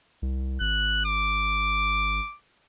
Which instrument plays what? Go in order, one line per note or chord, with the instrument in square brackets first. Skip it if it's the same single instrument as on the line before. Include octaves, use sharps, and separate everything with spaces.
[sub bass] C2
[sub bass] G#1 [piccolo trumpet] F#6
[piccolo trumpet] D6